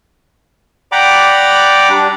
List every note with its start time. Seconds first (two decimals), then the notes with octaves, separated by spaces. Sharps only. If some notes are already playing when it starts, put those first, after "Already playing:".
0.92 D5 F#5 G5 A#5 B5 D6
1.90 G3 D4